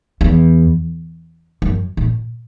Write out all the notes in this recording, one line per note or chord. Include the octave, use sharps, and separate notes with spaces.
E2
F#2
A#2